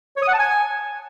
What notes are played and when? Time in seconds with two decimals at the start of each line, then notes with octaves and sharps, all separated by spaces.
0.17 C#5
0.23 D#6
0.28 F#5
0.34 A5
0.39 G#5